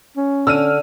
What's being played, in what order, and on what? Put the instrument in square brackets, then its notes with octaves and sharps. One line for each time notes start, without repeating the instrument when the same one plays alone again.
[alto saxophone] C#4
[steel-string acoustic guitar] D3 [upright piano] E6 F6 D#7